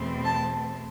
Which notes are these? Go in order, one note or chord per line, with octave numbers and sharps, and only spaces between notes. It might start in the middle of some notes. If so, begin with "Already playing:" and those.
Already playing: E2 B2 A3 C4
A5